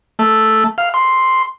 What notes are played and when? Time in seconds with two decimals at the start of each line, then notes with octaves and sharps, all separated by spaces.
0.19 A3
0.78 F5
0.94 C6